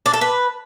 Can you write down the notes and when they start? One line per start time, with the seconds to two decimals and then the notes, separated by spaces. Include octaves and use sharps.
0.06 D4
0.14 A4
0.21 B4